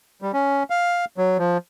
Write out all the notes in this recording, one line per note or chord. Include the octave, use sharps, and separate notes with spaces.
G3
C#4
F5
F#3
F3